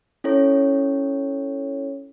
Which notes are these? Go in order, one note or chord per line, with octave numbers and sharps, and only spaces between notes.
C#4 E4 A4 C#5